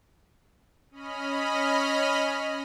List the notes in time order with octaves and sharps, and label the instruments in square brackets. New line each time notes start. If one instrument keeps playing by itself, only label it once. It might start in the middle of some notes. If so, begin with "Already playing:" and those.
[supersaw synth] C#4 D#5 B5 F6